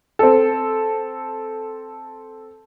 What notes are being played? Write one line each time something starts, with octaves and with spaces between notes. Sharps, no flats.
C4 A4